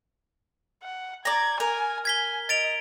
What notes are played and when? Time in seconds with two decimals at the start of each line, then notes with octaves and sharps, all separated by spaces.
0.83 F#5
1.25 D5 A#5 G#6
1.60 A#4 G#5
2.05 G#5 G#6 B6 G7
2.49 D#5 A6 D7 F7